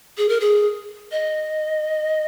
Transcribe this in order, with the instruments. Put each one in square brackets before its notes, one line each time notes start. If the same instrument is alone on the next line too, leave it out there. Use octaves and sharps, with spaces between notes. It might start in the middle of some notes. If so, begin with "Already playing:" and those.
[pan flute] G#4
A#4
G#4
D#5